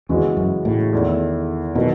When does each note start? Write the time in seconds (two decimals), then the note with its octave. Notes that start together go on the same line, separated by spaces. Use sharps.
0.09 E2 C#3 E3 G#3 C#4 F#4
0.37 F#2
0.65 A2
0.93 E2 D#3 A3 E4
1.75 B2 D#3 F#3 A3 E4